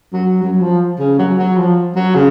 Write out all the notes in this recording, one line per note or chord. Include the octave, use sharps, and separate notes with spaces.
F#3
F#3
F3
C#3
F#3
F#3
F3
F#3
C#3